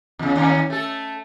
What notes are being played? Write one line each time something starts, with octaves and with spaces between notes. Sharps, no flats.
E2 C#3
D#2 C#4
A3 A4